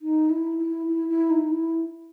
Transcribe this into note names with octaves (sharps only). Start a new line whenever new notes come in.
D#4
E4
E4
E4
E4
D#4
E4